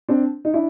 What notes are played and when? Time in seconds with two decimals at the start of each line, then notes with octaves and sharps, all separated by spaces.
0.09 C4 D4
0.45 D#4
0.54 D4 E4